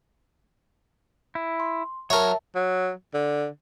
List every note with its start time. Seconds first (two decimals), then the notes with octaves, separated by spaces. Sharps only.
1.35 E4
1.60 C6
2.10 F#3 A#4 C#5 E5 A5
2.55 F#3
3.14 D3